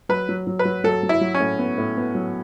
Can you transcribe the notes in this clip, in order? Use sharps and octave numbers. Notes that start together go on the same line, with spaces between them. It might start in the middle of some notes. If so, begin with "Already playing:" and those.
F#3 B4
F#3
F#3
B4
F#3
F#3 A4
F#3
E4
F#3
C#4
A2
B3
A2
B3
F#3